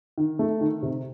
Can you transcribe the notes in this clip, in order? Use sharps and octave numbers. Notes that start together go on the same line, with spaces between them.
D#3
A3
D#3
C3